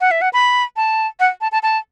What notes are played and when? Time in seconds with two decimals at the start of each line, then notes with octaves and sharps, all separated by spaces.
0.01 F#5
0.11 E5
0.22 F#5
0.33 B5
0.76 A5
1.20 F#5
1.41 A5
1.52 A5
1.63 A5